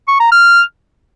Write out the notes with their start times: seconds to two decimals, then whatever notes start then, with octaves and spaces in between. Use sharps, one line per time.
0.08 C#6
0.20 A#5
0.32 F6